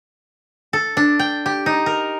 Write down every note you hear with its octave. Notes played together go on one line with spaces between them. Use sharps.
A4
D4
G5
G4
D#4
A#4